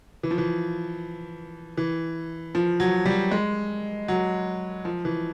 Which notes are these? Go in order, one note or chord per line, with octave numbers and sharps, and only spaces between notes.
E3
F3
E3
E3
F3
F#3
G3
G#3
F#3
F3
E3